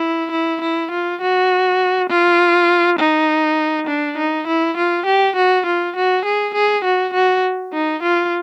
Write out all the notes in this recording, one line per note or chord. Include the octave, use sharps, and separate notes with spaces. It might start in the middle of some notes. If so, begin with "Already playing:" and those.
Already playing: E4
E4
E4
F4
F#4
F4
D#4
D4
D#4
E4
F4
G4
F#4
F4
F#4
G#4
G#4
F#4
F#4
D#4
F4